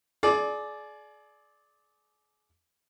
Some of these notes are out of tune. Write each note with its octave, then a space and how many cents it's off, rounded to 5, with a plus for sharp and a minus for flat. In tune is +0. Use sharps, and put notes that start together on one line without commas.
G#4 +35 D5 +0